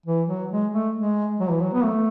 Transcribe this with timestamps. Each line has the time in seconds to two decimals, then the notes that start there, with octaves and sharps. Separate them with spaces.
0.06 E3
0.28 F#3
0.51 G#3
0.73 A3
0.95 G#3
1.40 F#3
1.51 E3
1.62 F#3
1.73 B3
1.84 A3